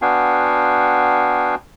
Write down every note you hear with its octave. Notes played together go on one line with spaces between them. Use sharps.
B3 D4 F#4 F5 G5 G#5